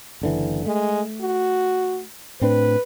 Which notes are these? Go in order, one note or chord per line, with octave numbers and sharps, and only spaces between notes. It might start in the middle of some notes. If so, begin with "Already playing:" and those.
F#1 D3 E3
G#3 A3
F#4
A2 C4 D4 B4